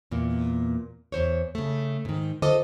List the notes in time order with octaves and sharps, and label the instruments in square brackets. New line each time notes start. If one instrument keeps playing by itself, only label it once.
[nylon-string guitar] E2 A#2 A#3
E2 C5 C#5
C#3 A3
G#2 D#3
[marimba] D3 [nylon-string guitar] F4 A4 D#5